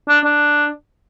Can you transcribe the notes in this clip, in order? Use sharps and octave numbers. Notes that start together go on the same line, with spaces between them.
D4
D4